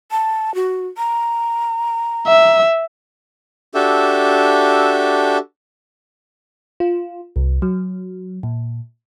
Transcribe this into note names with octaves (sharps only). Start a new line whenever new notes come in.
A5
F#4
A#5
E5
D4 F#4 G4 A4 E5
F4
C2
F#3
A#2